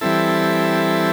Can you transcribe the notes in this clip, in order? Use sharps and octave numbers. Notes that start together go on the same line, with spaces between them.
E3 G3 C4 E4 A4